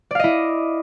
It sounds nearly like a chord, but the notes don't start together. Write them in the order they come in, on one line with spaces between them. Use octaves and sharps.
D5 F5 D#5 E4